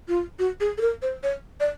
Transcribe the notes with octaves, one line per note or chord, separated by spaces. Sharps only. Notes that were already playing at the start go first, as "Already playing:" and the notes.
F4
F#4
G#4
A4
A#4
C5
C#5
D5